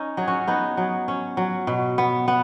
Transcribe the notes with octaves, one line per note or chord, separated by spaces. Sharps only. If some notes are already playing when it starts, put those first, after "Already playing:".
Already playing: C#4 D#4
F#3 G#4
C#4 F#4
B3 D#4 G#4
F#3
C#4
F#3
B2
B3
B3